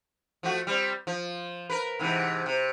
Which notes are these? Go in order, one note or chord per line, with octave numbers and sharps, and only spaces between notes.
F3 A3 F#4
G3 C4
F3
A#4 B4
G#2 C3 E3
C3